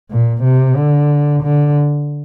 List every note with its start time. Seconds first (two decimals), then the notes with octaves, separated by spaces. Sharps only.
0.10 A#2
0.43 C3
0.76 D3
1.43 D3